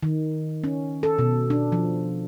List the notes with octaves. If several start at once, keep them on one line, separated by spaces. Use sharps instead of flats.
D#3
C#4
A4
B2
D4
F3